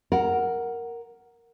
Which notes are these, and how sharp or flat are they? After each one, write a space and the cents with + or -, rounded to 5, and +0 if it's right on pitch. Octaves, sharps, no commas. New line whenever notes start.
A#4 +0 F#5 +0